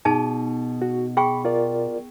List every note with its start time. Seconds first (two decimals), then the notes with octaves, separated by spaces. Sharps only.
0.05 B2 D#4 G#4 A5
0.82 F#4
1.17 G#4 G5 B5 C#6
1.45 F4 A#4 D5